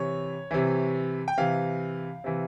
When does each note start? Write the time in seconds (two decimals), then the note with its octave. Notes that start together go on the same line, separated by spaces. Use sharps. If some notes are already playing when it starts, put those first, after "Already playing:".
Already playing: C3 E3 C#5
0.51 C3 E3
1.28 G5
1.37 C3 E3 F5
2.24 C3 E3